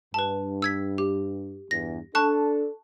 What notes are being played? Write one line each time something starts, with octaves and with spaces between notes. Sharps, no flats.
G2 B4 A5
E6 G#6 B6
G4
E2 G2 A#6
D4 A4 A5 C#6 F#6